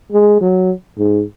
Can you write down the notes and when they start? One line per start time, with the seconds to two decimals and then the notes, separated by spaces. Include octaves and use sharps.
0.12 G#3
0.41 F#3
0.98 G#2